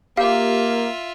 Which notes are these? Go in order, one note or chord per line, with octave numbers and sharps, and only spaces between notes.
A#3 F4 G4 E5 F5